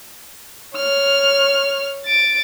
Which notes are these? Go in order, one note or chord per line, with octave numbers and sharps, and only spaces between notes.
C#5 F6
A6 D7